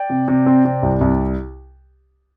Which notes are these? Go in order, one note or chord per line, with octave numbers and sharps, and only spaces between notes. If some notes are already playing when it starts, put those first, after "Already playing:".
Already playing: D5 G5
C3
C3
C4
C3
C2
C2